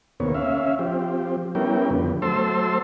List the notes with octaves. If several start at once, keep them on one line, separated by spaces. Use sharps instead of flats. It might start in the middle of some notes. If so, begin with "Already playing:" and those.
D#2 C3 A#3 B3 C#5
C#4 E5 F5
F3 C4 G4
G3 B3 C#4 E4 A#4 G5
F2 D3 B3
F#3 A3 C5 A5 C6 E6